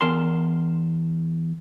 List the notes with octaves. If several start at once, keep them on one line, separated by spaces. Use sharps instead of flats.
E2 A#4 A5 C6